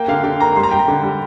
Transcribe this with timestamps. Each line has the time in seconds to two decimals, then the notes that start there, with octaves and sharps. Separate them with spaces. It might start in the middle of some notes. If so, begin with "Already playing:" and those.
Already playing: A#3 G5
0.08 D3 F5
0.24 D3 G5
0.40 A#3 A#5
0.56 G3 C6
0.63 A#5
0.71 G3 G5
0.79 A#5
0.88 D3
1.03 G3